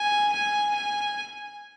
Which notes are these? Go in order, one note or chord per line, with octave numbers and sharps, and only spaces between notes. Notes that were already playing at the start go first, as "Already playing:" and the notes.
Already playing: G#5
G#5
G#5